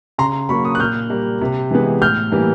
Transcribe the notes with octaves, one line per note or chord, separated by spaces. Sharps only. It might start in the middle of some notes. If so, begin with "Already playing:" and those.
C#3 A#5 C6
F#3 A#3 B5 C#6
C#6 D#6
F#6
A#2 F6 G6
G3 A#3
C3
E3 G#3 B3
A2 F6 G6
E3 G3 A#3